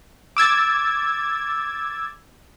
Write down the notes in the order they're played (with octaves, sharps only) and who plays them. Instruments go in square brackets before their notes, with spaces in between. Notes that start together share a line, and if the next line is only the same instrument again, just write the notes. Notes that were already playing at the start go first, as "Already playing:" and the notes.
[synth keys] D6 E6 G#6 A6